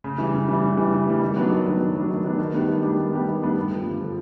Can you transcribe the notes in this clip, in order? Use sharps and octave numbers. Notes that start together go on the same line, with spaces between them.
C#3
E3 G3
C#3
E3 G3
C#3
E3 G3
C#3
E3 G3
D#3
F#3 B3 D4
D#3
F#3 B3 D4
D#3
F#3 B3 D4
D#3
F#3 B3 D4
D#3
G3 B3 D4 G4
D#3
G3 B3 D4 G4
D#3
G3 B3 D4 G4
D#3
G3 B3 D4 G4
G2
D3 F3
G2
D3 F3